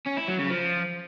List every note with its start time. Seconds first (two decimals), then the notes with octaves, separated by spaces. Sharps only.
0.06 C#4
0.17 E4
0.28 F#3
0.39 C#3
0.49 F3